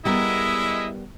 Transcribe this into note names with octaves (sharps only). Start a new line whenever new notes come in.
G3 G#3 B3 E4 A#4 D#5 E5